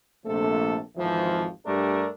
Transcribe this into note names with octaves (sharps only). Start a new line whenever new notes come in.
A#1 C3 F3 A3 A4
G#1 F2 E3 F3
G2 A3 D4 G4 A#4